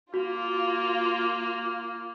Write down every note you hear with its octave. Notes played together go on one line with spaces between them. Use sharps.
A#3 F4 F#4